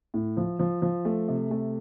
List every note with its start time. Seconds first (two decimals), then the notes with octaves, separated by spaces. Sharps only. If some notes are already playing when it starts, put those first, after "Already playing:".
0.14 A2
0.37 F3
0.59 F3
0.82 F3
1.05 A3
1.28 C3
1.51 A3